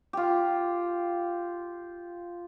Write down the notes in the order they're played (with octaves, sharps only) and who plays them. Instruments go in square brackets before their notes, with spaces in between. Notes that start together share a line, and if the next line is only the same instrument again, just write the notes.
[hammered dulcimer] F4 G4